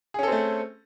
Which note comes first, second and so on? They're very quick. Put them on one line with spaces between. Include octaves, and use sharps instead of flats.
G#4 C#4 A4 C4 A3